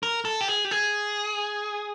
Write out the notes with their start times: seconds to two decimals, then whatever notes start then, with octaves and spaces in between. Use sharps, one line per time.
0.03 A#4
0.25 A4
0.41 G4
0.48 G#4
0.65 G4
0.71 G#4